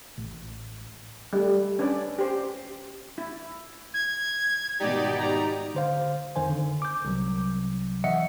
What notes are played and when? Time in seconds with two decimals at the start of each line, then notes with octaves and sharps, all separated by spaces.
0.18 A1
1.33 G3 A3
1.79 C#4 D4 B4 D5
2.19 G4 C5
3.18 E4
3.94 G#6
4.80 G#2 B2 D#3 D#4 G4 D5
5.19 A#5
5.75 D3 C5 F5
6.36 F2 D#3 C5 G#5
6.50 D3
6.82 D6 G6
7.05 C2 C3 F#3
8.04 E3 D#5 E5 F#5 C#7